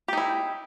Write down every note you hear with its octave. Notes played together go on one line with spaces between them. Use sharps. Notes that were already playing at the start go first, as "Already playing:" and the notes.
D#4 E4 G4